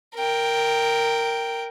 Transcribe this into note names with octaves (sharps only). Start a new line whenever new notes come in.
A#4 G5